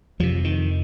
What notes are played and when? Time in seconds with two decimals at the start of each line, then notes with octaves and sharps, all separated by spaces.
0.20 F2 C3 F3
0.44 D#3